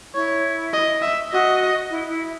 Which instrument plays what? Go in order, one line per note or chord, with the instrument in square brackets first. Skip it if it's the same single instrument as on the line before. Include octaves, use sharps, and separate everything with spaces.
[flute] E4 [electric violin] C#5
[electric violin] D#5
E5
[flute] F#4 [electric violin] D#5
[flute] E4
E4